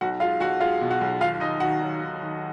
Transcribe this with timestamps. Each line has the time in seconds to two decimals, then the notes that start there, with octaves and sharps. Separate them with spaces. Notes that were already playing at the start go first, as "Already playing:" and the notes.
0.01 B1 F#4 F#5
0.20 G#3 F4 F5
0.40 B1 F#4 F#5
0.60 G#3 F4 F5
0.81 B2
0.90 F#4 F#5
1.01 B1
1.21 D#2 F4 F5
1.40 D#2 D#4 D#5
1.60 D#3 F#4 F#5
1.81 F#3
2.01 D#3
2.21 D#3